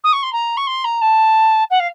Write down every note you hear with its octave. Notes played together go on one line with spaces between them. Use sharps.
D#6
C#6
C6
A#5
C#6
C6
A#5
A5
F#5
F5